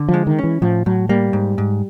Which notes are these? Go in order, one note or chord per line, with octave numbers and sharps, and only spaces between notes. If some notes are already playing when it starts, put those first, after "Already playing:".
Already playing: D3
F3
G#3
D#3
C#4
E3
A2 F3
A2 F#3
G3 A#3
G#2
G#2